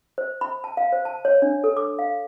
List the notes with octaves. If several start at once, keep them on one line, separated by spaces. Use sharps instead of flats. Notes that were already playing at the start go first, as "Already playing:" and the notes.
C5
B5
A5
F5
C5
A5
C#5
D4
A4
D6
F5